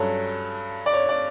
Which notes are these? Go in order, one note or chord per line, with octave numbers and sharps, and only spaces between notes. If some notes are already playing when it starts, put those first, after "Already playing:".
Already playing: G2 F#3 C#4 A4
D5
C#5
D5